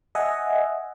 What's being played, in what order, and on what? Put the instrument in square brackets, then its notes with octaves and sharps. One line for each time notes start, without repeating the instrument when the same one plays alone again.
[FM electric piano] D#5 E5 F#5 G#5